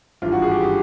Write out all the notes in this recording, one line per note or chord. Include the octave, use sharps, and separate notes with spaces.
G#1 G2 E3 F4
F#4
G#4
G4
G4